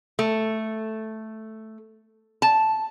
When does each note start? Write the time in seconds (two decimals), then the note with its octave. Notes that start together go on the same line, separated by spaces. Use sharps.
0.19 A3
2.42 A5